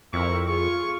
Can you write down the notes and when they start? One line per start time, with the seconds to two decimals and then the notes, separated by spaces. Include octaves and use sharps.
0.13 F2 C4 E4 A#4 C#6
0.47 F4 G#4 C#6